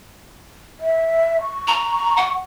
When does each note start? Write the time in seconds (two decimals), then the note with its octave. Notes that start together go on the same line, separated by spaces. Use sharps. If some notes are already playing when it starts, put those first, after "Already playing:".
0.80 E5
1.41 C#6
1.67 A#5
2.17 F#5